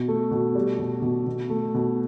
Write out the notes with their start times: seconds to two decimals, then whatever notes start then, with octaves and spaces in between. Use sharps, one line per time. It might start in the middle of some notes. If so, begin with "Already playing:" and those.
Already playing: B2
0.08 A3
0.31 B2
0.55 G3
0.79 B2
1.02 B2
1.27 B2
1.50 A3
1.74 B2